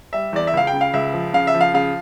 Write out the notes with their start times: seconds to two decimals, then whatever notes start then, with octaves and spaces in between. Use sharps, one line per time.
0.13 G3 E5
0.33 E2 D5
0.47 E5
0.53 C#2 F5
0.67 G5
0.73 C#3
0.81 F5
0.94 C#2 E5
1.13 F3
1.34 C#3 F5
1.47 E5
1.54 F3
1.61 F5
1.74 C#3 F5